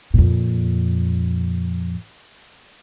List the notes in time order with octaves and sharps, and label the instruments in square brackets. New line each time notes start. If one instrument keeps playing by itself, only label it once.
[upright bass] F2 A#2